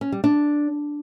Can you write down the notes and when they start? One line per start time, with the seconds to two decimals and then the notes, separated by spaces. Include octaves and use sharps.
0.01 C#4
0.12 G3
0.24 D4